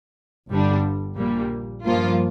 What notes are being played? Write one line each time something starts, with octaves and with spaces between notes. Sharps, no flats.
G1 G2 D3 G3 D4
A#1 A#2 G3 A#3
G2 F3 A#3 F4